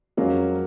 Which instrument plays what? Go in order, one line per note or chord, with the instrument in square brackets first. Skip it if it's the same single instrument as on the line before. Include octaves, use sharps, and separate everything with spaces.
[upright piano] F2 F3 G#3 C#4 F4 [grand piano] F#3 A#3